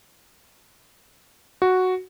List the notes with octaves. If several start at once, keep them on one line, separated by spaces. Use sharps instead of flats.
F#4